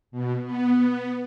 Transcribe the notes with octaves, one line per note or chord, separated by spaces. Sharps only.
B2
B3